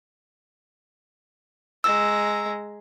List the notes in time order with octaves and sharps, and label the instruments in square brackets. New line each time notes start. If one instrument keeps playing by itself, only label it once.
[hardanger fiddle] G#3 A#5 [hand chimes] E6